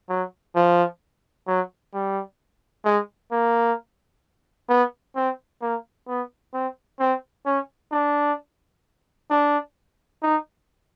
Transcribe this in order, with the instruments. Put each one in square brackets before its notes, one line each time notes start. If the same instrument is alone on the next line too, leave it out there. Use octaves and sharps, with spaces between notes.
[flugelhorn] F#3
F3
F#3
G3
G#3
A#3
B3
C4
A#3
B3
C4
C4
C#4
D4
D4
D#4